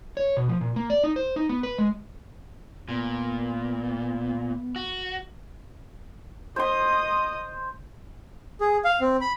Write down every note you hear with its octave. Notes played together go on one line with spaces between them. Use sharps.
C#5
B2
F3
A#2
A#3
D5
D#4
C5
D#4
B3
B4
G#3
A#2 B3
F#4
C5 D#5 C6 D#6
G#4
F5
C4
B5